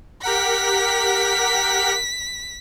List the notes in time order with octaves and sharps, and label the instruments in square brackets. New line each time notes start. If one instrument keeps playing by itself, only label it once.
[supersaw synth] G4 A#4 F#5 [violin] B6